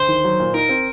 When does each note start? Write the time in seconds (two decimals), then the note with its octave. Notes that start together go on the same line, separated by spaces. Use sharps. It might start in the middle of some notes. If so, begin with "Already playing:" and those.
Already playing: D2 C5
0.08 D#3
0.24 F#3
0.40 A#2
0.54 D#4 A#4
0.69 C4